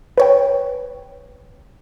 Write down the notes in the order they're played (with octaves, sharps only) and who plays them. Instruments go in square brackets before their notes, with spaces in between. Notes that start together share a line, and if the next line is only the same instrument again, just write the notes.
[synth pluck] B4 C#5 G5